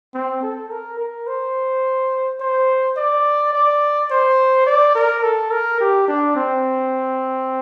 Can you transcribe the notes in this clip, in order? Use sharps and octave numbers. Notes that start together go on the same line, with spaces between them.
C4
A4
A#4
A#4
C5
C5
D5
D5
C5
D5
A#4
A4
A#4
G4
D4
C4